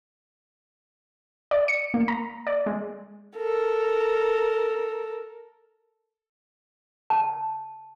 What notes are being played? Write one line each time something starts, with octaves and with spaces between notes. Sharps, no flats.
D5
C#7
A#3
A#5
D5
G#3
A4 A#4
A5